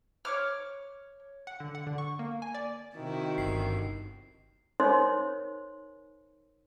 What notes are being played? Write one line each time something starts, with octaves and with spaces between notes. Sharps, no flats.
C#5 D6 F6
F#5
D3
F#5
D3
C#6
A#3
G#5
D5
C3 D#3 E4 F#4
G1 C7
D#4 A#4 C5 C#5 C6